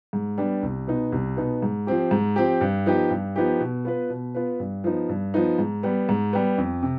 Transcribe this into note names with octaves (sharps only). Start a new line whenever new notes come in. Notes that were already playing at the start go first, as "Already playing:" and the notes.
G#2
G3 B3 D4
C2
B2 B3 D#4
C2
B2 B3 D#4
G#2
F3 C4 G4
G#2
F3 C4 G4
G2
F3 B3 D#4 G4
G2
F3 B3 D#4 G4
B2
B3 F4 B4
B2
B3 F4 B4
G2
F3 B3 D#4
G2
F3 B3 D#4
G#2
G3 B3
G#2
G3 B3
F2
C3